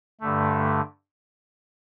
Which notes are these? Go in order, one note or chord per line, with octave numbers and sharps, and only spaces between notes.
G2 D3 A3